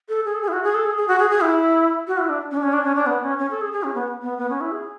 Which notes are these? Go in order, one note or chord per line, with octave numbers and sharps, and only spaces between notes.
A4
G#4
A4
G#4
E4
F#4
G#4
A4
G#4
G#4
F#4
G#4
G#4
E4
F#4
E4
D4
C#4
D4
C#4
D4
C#4
D4
B3
C#4
C#4
A4
G#4
G#4
C#4
B3
B3
B3
C#4
E4
G#4